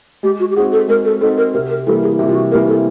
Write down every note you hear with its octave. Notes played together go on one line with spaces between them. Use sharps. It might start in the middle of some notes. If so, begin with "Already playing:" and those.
G#3 G4
F#4
G4
C4 D#4 F#4 G#4
A4
G#3 A#4
A4
C4 D#4 F#4 A4
A#4
C3 A#4
A#4
E3 G3 A#3 A4
G#4
C3 G4
F4
F#4
E3 G3 A#3 A#4
A4